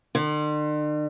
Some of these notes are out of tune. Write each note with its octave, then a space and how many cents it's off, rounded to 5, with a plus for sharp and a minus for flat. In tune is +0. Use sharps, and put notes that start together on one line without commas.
D3 +45